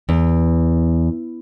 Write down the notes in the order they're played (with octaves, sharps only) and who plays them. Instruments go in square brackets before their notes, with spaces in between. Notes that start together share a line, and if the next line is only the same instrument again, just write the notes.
[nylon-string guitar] E2